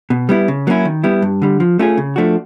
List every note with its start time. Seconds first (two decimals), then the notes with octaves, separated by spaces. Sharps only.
0.10 B2
0.29 G3 B3 E4
0.48 C#3
0.67 F#3 A#3 C#4 E4
0.85 D#3
1.04 G3 B3 E4
1.22 G2
1.42 D3 G3
1.60 F3
1.79 A3 C#4 F4 G#4
1.98 C#3
2.16 F3 A3 D4 F#4